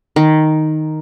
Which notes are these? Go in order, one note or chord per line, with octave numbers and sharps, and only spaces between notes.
D#3